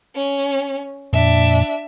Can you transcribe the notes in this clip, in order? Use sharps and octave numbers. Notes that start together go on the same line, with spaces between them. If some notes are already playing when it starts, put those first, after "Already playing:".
C#4
F2 A#2 D4 E5